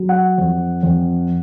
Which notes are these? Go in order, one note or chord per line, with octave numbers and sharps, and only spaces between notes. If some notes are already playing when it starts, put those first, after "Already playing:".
Already playing: F#3
F#5
F2
F2